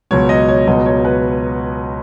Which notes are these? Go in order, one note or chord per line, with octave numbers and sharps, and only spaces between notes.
C#2 B2 F#3 C#5
D#5
C#5
C#2 B2 F#3 D#5
C#5
B4